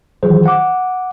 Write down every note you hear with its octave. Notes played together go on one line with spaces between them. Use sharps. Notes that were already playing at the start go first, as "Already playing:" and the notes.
D#3 E3 F#3 F4 G#4 C5
F#5 D6